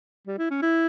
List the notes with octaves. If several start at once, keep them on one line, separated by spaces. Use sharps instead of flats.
G3
E4
C#4
E4